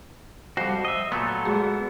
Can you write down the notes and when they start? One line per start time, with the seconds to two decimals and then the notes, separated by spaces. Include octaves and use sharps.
0.57 F2 G3 F#4 C5
0.85 D#5 E5
1.12 A#2 F#3 A3 B3 A4
1.45 G#3 F#4 G#4